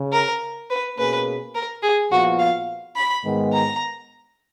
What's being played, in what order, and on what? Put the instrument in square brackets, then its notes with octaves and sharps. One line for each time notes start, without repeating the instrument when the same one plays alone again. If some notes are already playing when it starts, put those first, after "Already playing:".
Already playing: [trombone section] C#3
[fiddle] A#4
B4
[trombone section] B2 A#3 C#4 G#4 [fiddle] B4
[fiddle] A#4
G#4
[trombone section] A#2 F3 B3 F4 [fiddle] F#4
[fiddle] F5
B5
[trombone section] G#2 D#3 G#3 B3
[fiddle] A#5